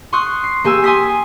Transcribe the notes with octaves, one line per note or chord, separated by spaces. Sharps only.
C6 C#6 D#6 F#6
C7
A#3 G4 G#5 E6
G#5 C6 D#6 B6